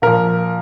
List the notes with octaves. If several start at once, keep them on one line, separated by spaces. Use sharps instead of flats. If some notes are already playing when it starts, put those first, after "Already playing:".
A#2 F3 A#4